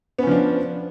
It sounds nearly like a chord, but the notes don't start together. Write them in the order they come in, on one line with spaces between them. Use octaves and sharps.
B3 C#4 F3 D4